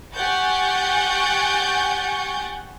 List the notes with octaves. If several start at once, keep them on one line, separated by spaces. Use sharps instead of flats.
G4 F#5 G#5 C#6 G6 A6